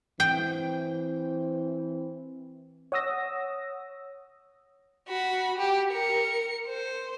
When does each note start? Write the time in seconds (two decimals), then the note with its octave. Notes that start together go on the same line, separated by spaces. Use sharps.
0.20 E3 C4 G5
2.92 C#5 F#5 D#6 E6 A#6
5.08 F#4 B5
5.58 G4
5.92 A#4 C#7
6.68 C5